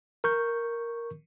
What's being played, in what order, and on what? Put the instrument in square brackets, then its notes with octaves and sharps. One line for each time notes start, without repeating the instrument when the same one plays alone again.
[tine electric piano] A#4 C#6 G6